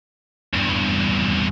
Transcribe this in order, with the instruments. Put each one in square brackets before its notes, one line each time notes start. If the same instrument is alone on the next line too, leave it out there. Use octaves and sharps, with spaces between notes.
[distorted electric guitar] E2 G2